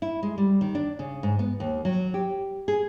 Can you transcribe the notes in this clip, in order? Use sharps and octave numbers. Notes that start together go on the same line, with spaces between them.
E4
G#3
G3
D#3
D4
C#3
G#2
B3
D#2
F#3
G4
G#4